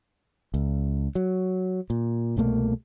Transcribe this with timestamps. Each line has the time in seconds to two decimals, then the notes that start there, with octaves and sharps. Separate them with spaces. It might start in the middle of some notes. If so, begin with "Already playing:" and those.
0.54 C#2
1.15 F#3
1.90 A#2
2.37 C2 B2 A3 A#3